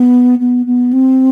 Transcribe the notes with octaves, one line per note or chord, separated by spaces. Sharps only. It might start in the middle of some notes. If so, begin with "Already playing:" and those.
Already playing: B3
B3
B3
C4